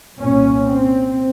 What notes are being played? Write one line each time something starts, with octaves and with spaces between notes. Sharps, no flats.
C2 A#2 C#4
C4